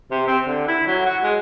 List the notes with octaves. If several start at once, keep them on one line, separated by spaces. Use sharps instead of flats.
C3
C4
D3
E4
F#3
F#4
G#3